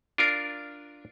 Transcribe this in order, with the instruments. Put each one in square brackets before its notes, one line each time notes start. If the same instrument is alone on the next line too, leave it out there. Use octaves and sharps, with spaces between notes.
[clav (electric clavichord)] D4 F4 A#4